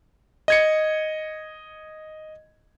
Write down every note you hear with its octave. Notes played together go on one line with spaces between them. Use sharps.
D#5 G#6 C#7